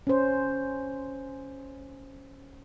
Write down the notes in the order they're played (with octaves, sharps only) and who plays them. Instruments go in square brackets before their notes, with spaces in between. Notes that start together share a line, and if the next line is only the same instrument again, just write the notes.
[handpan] C#4 C5